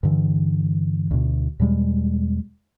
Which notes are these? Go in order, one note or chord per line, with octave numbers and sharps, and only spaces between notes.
G2 D3 E3
D2 B2
E2 B2 G3 G#3